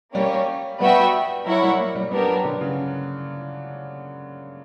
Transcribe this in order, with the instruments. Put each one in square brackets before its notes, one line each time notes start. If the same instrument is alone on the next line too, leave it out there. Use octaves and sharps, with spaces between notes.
[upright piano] G3 [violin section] A#3 C#4 G4 C#5
[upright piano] G3 [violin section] B3 F#4 B4 E5 G5
[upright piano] F#3 [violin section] E4 A#4 C#5 F#5
[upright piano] G3
A#3
G3
[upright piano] G3 [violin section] B3 D4 G4 A#4
[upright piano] F#3
D3
C#3